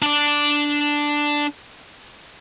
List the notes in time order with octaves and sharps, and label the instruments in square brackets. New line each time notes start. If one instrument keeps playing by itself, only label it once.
[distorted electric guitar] D4 D5